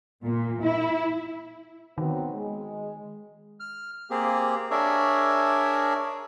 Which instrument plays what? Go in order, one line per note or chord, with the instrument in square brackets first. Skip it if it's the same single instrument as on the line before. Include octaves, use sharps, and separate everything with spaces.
[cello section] A#2
E4
[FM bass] D#3 [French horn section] F#3 B3 C4
[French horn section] G#3
[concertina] F6
A#3 C4 G4 G#4
D4 G#4 A#4 C#5 D5 E5